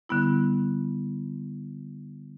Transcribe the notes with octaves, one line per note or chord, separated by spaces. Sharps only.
D3 G3 B3 E4